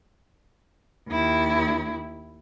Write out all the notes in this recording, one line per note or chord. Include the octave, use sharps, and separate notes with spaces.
D#2 E4